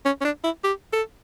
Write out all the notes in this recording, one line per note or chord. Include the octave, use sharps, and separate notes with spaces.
C#4
C#4
D4
E4
G4
A4